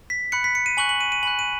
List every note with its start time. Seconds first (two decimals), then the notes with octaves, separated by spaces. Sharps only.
0.10 B6
0.32 B5 F#6 C#7
0.44 B6
0.55 C#7
0.66 D#7
0.77 G#5 C#6 F#6 F#7
0.89 F#7
1.01 D#7
1.12 D#7
1.23 G#5 B5 F#6 F#7
1.39 D#7